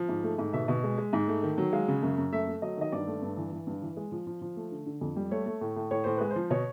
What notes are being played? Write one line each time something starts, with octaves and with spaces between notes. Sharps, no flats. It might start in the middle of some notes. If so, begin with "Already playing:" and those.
Already playing: F3
G#2
A3
G#2
B2 E5
B2
G#3
G#3
G#2
A3
D#3
F#3
G#3 F5
C#3
F#2
F#2
A3 E5
A3
F#3 D#5
D#3 D#5
G2 D5
A3
G2
E3
E3
G2
E3
G#3
F3
F3
F3
A3
D3
D3
F2
G3
A3 C#5
A3
A2
A2
A2 C#5
A2 C5
G#3 B4
C5
F3
B2 C#5